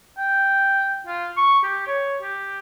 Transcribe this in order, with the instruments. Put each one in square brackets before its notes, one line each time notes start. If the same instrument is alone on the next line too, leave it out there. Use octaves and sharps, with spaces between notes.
[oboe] G5
F4
C#6
G4
C#5
G4